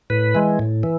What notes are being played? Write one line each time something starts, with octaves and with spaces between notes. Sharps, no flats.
A2 B4
E3 G#3
A2
E3